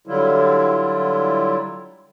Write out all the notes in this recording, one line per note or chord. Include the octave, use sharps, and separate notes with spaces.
D3 F#3 G3 E4 F4